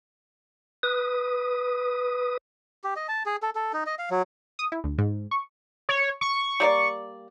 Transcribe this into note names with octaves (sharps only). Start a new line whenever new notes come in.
B4 D#6
G4
D#5
A5
G#4
A4
A4
D#4
D#5
F5
F#3
D#6
E4
D2
G#2
C#6
C#5
C#6
G3 A#3 D5